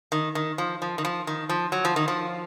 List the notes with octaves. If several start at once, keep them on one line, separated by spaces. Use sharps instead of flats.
D#3
D#3
F3
F3
D#3
F3
D#3
F3
F#3
F3
D#3
F3